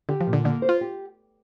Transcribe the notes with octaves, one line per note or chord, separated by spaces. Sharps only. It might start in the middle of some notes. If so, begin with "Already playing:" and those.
D3 G4
F3
A#2
D3
D3 A#3
C5
F4
G4